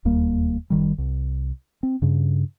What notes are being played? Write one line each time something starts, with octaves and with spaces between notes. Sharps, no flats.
E1 D#2 G3 A#3
F#1 D#3 G3
C2
C4
G2 C#3